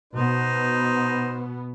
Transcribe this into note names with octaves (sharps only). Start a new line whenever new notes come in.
B2 B3 D#4 C5